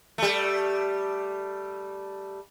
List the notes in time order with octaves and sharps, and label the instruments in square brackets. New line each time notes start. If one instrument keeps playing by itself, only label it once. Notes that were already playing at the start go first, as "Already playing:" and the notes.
[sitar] G3 A3